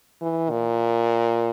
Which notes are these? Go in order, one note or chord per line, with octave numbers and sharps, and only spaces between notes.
E3
A#2